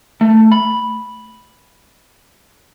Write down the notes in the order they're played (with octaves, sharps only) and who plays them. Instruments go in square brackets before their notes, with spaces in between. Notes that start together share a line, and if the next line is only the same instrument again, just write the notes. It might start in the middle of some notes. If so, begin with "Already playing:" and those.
[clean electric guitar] A3
B5